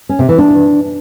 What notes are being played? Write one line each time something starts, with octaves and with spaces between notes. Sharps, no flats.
C#4
C3
E3
D4